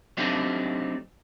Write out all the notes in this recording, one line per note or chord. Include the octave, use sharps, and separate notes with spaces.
F#3 A3 C4 D4 D#4 G4